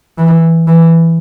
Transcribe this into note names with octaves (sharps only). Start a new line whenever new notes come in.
E3
E3